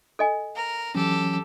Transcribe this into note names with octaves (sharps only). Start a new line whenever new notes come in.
A4 D#5 G#5
A#4
E3 F#3 C#4 G4 A4